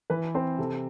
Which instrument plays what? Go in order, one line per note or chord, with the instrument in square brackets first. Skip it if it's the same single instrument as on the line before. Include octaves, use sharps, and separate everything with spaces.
[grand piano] E3 [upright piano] B4
[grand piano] C4 [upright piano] C5
[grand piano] C3 [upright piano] A4